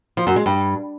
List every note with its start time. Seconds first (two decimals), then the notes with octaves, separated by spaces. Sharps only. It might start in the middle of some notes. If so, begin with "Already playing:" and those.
0.17 F3
0.27 F#2
0.36 G#3
0.46 G2